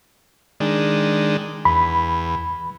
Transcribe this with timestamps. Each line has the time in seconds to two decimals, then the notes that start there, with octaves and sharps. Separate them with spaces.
0.60 D#3 G#3 D4
1.65 E2 B5